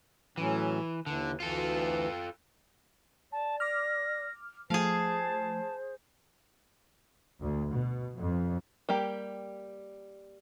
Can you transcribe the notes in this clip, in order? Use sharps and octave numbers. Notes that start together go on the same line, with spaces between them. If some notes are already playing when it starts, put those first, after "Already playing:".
A2 E3 F#3 C#4
D#2 D3 E3
D2 E3 F4 A4
D5 A5
D6 F6 A#6
F3 A3 G#4 C5 F5 A5
D2
B2
F2
G3 A#3 G4